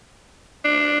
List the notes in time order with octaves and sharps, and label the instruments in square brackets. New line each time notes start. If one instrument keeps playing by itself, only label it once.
[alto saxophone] D4